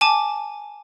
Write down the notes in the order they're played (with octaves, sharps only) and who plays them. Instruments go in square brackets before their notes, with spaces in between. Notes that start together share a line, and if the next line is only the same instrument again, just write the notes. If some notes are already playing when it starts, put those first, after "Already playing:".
[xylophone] G#5 A5 D6